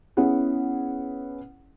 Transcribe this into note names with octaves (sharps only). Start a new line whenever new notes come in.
B3 C#4 E4 G#4 F#5